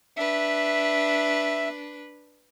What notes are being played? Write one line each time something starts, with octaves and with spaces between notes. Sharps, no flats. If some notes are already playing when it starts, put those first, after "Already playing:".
D4 B4 E5